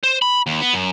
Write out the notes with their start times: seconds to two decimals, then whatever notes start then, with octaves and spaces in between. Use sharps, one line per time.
0.04 C5
0.22 B5
0.47 D#2
0.61 B3
0.74 F#2